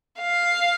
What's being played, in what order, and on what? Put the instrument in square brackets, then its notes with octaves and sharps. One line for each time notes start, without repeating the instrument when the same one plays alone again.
[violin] F5